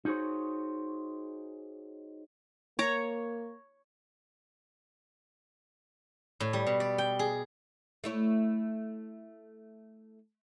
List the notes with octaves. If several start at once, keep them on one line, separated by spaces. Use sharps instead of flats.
D#4 F#4 G#4 C5 C#5
A#3 C#5 A#5
A2
G3
B2
D5
G5
G#4
A3 E4 C#5